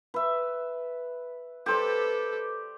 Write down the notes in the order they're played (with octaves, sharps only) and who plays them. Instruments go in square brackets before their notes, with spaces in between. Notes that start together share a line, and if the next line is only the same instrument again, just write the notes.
[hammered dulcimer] B4 E5
[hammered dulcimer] G4 C5 D5 [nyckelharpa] A4 B4